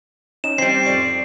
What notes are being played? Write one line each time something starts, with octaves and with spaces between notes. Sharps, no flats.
C#4 D#4 D#5 E7
G3 C4 C5 C7
F2 D5 C#6